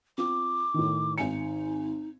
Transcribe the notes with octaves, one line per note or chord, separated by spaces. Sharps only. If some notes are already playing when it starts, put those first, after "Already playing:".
C4 F4 D6
A2 D#3
G#1 D#4 G#5 C#7